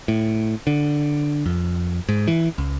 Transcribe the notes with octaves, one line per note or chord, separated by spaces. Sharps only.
A2
D3
F2
G#2
E3
C#2